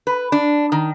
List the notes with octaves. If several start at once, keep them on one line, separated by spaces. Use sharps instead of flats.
B4
D4
D#3